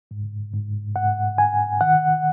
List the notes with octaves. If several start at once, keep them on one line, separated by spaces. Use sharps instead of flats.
G#2
G#2
G#2 F#5
G#2 G#5
D#3 F#5